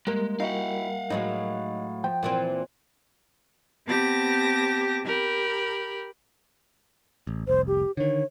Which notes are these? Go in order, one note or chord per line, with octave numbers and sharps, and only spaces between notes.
G3 G#3 A#3 A#4
D#4 E4 F#4 F5 F#5
A2 F#3 G#3 D#4
F3 G5
A#2 E3 C4
B3 C4 G4 A5 D6 A#6
G4 A#4 B5
A1
F1 C2 C5
G4
D3 D#3 C#5